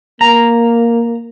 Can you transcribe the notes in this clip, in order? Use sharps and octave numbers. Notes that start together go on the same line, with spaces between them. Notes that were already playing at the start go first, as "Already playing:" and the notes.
A#3 A#5